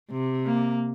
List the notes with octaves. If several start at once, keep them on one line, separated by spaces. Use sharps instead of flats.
C3
A#3